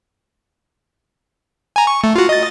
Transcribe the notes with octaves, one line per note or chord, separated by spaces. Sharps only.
G#5 A#5
C#6
A3
F4 F#4
D#5 A6